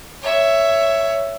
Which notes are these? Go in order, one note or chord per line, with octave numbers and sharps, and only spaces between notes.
C#5 E5